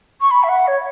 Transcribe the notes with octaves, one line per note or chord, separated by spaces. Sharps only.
C#6
B5
E5
F#5
C#5